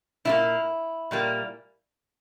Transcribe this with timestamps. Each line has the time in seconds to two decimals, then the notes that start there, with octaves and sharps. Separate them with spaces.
0.25 A#2 G3 A#3 E4
1.11 A#2 G3 A#3